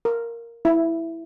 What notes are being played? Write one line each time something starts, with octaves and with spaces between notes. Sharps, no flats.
A#4
E4